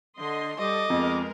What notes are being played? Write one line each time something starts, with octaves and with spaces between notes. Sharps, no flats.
D3 D#5 C6
G3 A4 D#5 D6
F2 G#3 B3 A#4